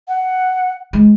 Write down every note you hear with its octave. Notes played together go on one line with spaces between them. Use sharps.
F#5
G#3